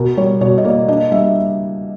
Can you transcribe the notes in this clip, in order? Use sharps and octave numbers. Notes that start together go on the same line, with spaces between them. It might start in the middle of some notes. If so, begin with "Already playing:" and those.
Already playing: B2 A#4
G3 C#5
B2 C#5
D#5
A#3 D5
D4 D#5
G3 E5